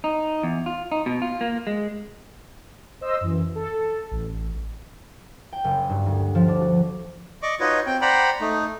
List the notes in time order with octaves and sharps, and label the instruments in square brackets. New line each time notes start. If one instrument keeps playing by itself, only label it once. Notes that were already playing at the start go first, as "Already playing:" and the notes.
[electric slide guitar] D#4
E2
F4
D#4
B2
F4
A#3
G#3
[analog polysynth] C5 D#5 E6
F#2 E3
A4
A1
[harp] G5
F#1
G2
D2
F3
D4
F#4
[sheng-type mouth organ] D5 D#5 C#6 D6
D#4 F4 F#4 B4 C#5 D#5
C4 G5
C5 D5 F#5 G5 A#5 B5
A3 D#4